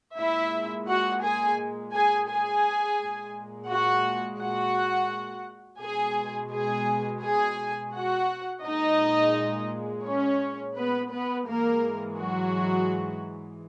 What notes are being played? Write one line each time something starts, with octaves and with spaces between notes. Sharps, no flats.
A#2 G#3 E4 E5
F#4 F#5
G#4 G#5
G#4 G#5
G#4 G#5
A#2 G#3
F#4 F#5
F#4 F#5
B2 G#3 G#4 G#5
G#4 G#5
G#4 G#5
F#4 F#5
A#2 G#3 D#4 D#5
C#4 C#5
B3 B4
B3 B4
G#2 E3 G#3 A#3 A#4
F#3 F#4